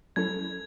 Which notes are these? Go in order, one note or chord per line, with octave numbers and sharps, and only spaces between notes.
F#3 C#4 E4 A4 G#6